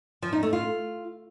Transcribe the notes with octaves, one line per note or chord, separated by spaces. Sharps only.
F3
D#4
A3
F4